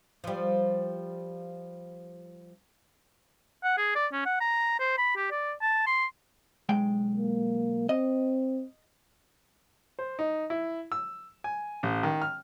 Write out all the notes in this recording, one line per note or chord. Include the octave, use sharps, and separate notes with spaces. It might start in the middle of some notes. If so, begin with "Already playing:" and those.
F3 G3
F#5
G#4
D5
C#4
F#5
A#5
C5
B5
G4
D5
A5
C6
B1 G#3 G5
A#3
C4 D#5
C5
D#4
E4
E6
G#5
A1
D#3
F6